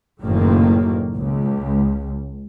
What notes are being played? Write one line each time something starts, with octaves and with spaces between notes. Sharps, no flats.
F#1 A2 D#3 A#3
C#2